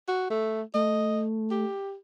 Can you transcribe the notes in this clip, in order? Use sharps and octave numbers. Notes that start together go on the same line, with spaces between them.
F#4
A3
A3 D#5
G4